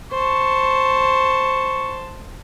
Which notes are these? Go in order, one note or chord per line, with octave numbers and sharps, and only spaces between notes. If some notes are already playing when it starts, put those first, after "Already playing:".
C5 A5 C#6